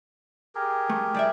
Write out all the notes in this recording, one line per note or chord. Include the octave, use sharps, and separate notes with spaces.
G4 G#4 A#4
A3
G3 D5 E5